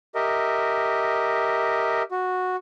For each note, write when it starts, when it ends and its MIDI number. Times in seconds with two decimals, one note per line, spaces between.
0.15 2.03 67
0.15 2.03 70
0.15 2.03 75
0.15 2.03 76
2.11 2.56 66